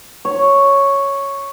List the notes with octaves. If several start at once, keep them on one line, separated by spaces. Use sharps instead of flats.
C#5